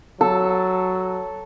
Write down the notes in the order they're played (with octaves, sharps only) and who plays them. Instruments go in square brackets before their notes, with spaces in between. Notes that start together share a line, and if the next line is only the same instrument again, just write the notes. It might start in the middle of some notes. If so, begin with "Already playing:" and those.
[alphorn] F#3 [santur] A4 A5 E6